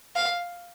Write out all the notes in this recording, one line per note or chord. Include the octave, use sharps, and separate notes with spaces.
F5